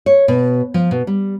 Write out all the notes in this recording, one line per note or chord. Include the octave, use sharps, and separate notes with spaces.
C#5
B2
F3
B2
G3